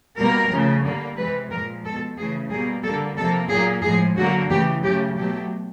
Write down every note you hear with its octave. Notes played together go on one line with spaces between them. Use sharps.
B2 G3 A#3 A#4
C#3 F3 A3
D3 G3 A#3
C3 E3 G#3 B4
A#2 F3 G#3 A#4
B2 G#3 A4
C#3 E3 A3 G#4
B2 G3 A#3 G#4
D3 G3 A#3 A4
C3 F3 A#3 A4
A#2 F#3 A#3 G#4
A2 F3 G#3 G#4
D3 F#3 A#3 F#4
C#3 E3 A3 G4
C#3 F#3 A3 G4
B2 F#3 A3 G4